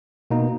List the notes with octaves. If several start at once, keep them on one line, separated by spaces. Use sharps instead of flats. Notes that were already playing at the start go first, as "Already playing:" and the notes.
B2 A#3 D#4